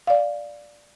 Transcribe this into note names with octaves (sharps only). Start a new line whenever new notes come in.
D5 F5